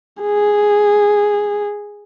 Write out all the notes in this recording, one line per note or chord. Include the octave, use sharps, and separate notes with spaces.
G#4